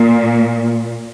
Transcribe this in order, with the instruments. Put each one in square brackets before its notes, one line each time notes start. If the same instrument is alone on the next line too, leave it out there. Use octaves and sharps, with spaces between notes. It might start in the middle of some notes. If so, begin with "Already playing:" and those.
Already playing: [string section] A#2